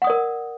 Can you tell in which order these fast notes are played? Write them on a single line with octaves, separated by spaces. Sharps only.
F#5 D#6 D5 A#4